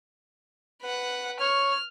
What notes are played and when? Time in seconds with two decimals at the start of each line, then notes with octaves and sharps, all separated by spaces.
0.82 B4 F#5
1.40 C#5 F6